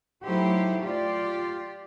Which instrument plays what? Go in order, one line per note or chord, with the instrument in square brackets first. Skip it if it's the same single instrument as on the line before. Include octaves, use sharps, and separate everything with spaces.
[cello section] F#3 A3 D#4 E4 G4 C5
F4 G4 D5